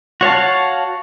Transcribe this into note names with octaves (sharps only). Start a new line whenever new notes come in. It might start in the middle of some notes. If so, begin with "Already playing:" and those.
F#4 C#5 F5 A5